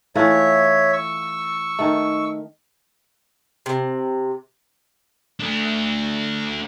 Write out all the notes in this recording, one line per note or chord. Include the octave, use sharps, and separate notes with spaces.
E3 A3 F4 C#5 E5
C#6 E6
D#3 A3
C3
A3 D4